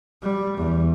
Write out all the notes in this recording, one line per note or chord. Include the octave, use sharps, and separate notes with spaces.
G3
E2